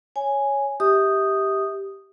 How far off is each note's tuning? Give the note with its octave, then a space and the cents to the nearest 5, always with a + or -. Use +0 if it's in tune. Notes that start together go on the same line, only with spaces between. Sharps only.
C#5 +0 G#5 +0
G4 +0 E5 -35 D#6 -5